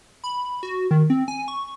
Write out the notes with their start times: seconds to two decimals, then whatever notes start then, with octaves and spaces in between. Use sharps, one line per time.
0.24 B5
0.63 F#4
0.91 D#3
1.10 C4
1.28 G#5
1.48 C#6